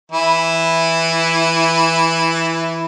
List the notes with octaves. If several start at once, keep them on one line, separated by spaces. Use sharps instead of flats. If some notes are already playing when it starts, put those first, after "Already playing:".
E3 E4